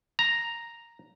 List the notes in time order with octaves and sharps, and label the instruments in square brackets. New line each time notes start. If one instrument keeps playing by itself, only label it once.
[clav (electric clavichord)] A#5